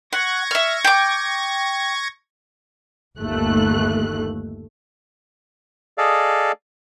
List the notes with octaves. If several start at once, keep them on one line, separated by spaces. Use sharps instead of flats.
F#5 C#6 G#6 A#6
E5 F6
G5 D6
G1 D#2 A3 F#6
G#4 A4 D5 D#5 F5